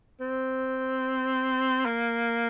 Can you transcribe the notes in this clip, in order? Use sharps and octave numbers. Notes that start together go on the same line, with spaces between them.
C4
A#3